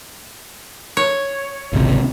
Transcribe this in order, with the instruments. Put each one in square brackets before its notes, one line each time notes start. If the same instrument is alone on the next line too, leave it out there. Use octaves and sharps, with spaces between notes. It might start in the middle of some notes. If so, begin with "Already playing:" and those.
[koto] C#5
[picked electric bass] G#1 C#2 C3